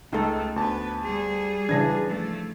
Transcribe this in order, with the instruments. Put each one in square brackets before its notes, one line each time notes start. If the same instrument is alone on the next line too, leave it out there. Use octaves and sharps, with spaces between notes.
[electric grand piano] C#2 [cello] A3 [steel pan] D#4 A4
[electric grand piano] D2 A5 [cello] B3 B4
[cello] G3 G#4
[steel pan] C#3 E3 D4 [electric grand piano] G#6 A#6
[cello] F3 A3